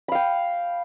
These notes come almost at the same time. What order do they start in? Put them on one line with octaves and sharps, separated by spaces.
B5 F5 G5